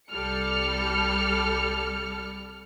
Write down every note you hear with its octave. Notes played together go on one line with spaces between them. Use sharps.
C2 G3 A4 F6 C#7